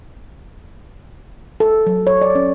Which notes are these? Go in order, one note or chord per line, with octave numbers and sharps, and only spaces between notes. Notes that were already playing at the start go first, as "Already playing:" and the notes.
A4
F#3
C#5
D5
C#4